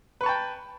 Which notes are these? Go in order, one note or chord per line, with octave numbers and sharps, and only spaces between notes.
B4 G5 A5 C#6